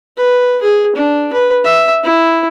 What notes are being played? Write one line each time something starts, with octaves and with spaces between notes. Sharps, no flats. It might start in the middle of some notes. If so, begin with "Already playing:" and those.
B4
G#4
D4
B4
E5
E4